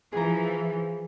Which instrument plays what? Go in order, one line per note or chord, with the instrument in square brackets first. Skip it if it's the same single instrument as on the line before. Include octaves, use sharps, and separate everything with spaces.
[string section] E3 F3 [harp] G#4 G#5 A#5